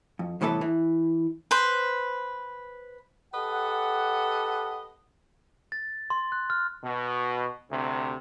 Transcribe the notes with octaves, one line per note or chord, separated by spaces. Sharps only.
F2
C2 A2 E3 B3 A4
E3
B4 C5
G4 A4 B4 D#5 F#5
A6
C6
F#6
F6
B2
D2 C3